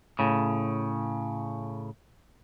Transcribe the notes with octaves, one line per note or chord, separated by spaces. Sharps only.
A2 C#3